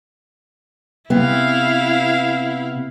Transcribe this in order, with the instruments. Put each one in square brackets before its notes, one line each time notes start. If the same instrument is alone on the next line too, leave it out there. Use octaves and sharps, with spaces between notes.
[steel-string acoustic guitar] C3 B3 [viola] E4 F5